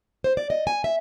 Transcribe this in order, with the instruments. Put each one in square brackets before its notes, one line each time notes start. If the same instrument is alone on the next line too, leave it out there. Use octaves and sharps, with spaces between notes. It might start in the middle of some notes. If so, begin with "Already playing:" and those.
[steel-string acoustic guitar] C5
D5
D#5
G#5
E5